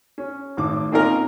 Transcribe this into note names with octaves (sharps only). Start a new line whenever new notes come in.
C#4
G#1 A2 D6
A#3 C4 C#4 D#4 F4 A#4